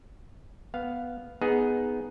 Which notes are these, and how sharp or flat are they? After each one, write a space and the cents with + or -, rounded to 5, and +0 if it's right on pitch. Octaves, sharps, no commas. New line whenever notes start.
B3 +0 F5 +0
B3 +0 D#4 +5 G#4 +0